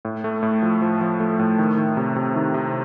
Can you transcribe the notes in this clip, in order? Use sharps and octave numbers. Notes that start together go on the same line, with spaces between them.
A2
A3
A2
F3
F3
F3
A3
A2
D#3
D#3
C3
C3
D#3
C3